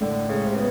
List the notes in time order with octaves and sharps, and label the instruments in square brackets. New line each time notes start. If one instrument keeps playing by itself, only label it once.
[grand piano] A2 [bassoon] D3
[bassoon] C#3 [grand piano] G#3
[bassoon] C3
[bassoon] C#3 [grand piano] B3